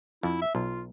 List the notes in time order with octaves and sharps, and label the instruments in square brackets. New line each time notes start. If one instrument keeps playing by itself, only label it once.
[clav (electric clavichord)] F2 [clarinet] E4
[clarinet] E5
[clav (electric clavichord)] B1 [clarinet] F4